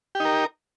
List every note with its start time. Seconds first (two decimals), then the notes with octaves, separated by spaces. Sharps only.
0.15 G4
0.20 D#4
0.25 A#4